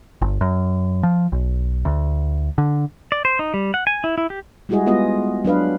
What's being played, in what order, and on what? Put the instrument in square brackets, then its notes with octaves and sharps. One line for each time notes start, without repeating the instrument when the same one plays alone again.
[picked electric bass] G1
F#2
F3
B1
D2
D3
[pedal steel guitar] D5
C5
D#4
G3
F#5
G#5
E4
E4
G4
[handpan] G3 G#3 E4 F#4 G#4 D#5
G#3 B3 F4 D#5
F#3 D4 B4 F5